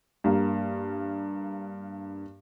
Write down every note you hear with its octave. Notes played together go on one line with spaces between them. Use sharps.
G2 A#3